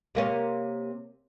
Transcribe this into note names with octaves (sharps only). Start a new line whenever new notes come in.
C3 A#3 C#4